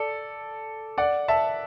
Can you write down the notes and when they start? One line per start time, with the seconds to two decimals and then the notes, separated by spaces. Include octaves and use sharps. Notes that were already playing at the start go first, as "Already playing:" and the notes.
Already playing: A4 D5
0.98 D5 F#5
1.28 E5 A5